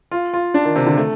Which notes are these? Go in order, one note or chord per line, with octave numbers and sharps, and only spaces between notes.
F4
F4
D4
D#3
C3
D3
A3